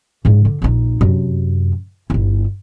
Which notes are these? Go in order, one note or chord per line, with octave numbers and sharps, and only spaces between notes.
G#2 C#3
D3
A#1 D#4
F#2 C3
G1 E4